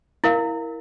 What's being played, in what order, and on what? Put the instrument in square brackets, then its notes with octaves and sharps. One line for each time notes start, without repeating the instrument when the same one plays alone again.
[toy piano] E4 A#4 F5